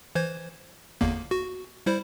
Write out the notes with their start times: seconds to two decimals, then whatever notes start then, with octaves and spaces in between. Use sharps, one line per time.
0.15 E3 C5 G#6
1.01 G1 E2 A#3
1.31 F#4
1.86 G3 E4 C5